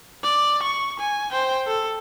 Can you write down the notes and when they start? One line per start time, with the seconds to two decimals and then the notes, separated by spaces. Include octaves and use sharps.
0.23 D5
0.63 C#6
0.99 G#5
1.32 C5 G5
1.67 A4